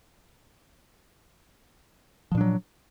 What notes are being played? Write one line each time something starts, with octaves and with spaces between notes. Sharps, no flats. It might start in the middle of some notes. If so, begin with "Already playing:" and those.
A#2 F3 F#3 D4